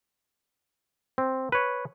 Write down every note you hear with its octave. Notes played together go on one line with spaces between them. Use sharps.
C4
B4 C#5